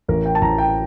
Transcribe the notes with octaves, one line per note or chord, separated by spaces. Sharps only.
A1 A#4
G5
A5
A1 A#5
G5